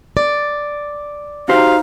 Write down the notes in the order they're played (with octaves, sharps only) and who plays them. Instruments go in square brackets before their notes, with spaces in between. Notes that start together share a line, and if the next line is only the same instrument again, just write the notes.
[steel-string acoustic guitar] D5
[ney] D#4 [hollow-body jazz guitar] F#4 G4 C5 [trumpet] F5